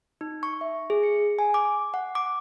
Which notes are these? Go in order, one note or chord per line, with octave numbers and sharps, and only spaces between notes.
D#4
C#6
E5
G#4
C#7
G#5
D6
F#5
D6